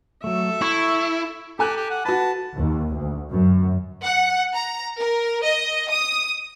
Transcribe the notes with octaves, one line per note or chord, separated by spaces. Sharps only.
F#3 A3 A4 E5
E4 C#6
G4 A4 G#5 F#6
G4
F#5
F#4 B4 A5
D#2
D2
F#2
F#5
A#5
A#4
D#5
D#6